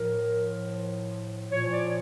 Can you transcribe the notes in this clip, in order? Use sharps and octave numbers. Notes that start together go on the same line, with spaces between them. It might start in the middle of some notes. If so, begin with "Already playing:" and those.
Already playing: A2 F3 A#4
A#2 F3 C#5
D5